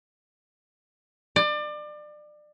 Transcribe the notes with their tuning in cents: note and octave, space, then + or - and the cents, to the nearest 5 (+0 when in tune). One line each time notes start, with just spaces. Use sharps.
D5 +30